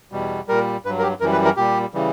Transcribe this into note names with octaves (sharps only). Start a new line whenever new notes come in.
E2 B2 G3
A#2 G3 A#4
G2 F#3 B4
A#4
G4
F#2 E3 G3 A#4
B4
A#4
A#2 G3 G4
C#3 E3 G3